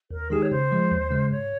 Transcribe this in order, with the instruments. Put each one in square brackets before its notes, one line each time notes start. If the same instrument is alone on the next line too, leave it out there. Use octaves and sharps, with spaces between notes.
[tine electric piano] D#2 [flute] A#4
[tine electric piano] D#3 G#3 D#4 G4 [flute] G#4
[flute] C#5
[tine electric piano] C#3 [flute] C5
[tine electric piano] F3 G#3
D#2
C#3 G#3
[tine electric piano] G#2 [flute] C#5